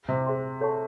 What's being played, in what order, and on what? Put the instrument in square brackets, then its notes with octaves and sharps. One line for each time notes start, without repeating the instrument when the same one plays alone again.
[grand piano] C3
[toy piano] G#4 C5 E5 G5 C6
A4 C#5 F#5 A5 C#6